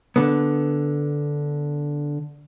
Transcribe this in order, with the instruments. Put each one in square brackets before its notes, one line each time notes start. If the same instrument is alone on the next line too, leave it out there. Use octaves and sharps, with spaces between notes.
[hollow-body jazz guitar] D3 B3